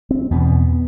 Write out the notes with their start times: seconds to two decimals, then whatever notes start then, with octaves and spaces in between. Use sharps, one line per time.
0.11 C4
0.31 E2 B2 B3